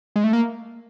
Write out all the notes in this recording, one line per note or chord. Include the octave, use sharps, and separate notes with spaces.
G#3
A3
A#3